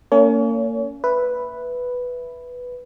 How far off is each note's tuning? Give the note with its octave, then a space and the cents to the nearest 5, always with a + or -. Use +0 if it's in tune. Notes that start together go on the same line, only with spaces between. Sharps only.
A#3 -30 C#4 +25 C#5 +40
B4 +0 E5 +0